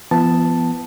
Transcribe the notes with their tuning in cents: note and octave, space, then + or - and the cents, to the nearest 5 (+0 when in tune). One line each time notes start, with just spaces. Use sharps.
F3 -45 B3 +0 A5 +0